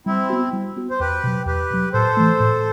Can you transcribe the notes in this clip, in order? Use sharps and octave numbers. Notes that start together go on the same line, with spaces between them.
G3 C4 E4
B3 F#4
G3
B3 F#4
C5
E2 G4 B4
B2 F#3
E2 G4 B4
B2 F#3
A2 A4 C5
E3 A3
A2